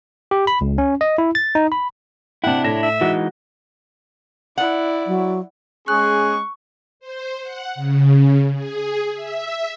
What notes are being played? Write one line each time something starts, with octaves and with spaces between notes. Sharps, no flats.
G4
B5
C#2
C#4
D#5
E4
A6
D#4
B5
C3 D4 E4 F#5 G5
A2 C#5 A#6 E7
E5
E3 G#3 D#4 F#4
E4 D5 F#5
F#3
G#3 C#4 G#4 C#6 F#6
C5
F#5
C#3
G#4
E5